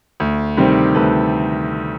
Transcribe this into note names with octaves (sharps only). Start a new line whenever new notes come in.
D2
C3 D#3 G3 C4
D2 A4 B4